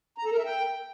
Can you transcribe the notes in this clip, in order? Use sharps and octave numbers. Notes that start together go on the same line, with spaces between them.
A#5
A4
A#4
E5
G5